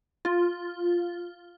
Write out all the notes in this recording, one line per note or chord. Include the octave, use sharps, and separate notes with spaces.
F4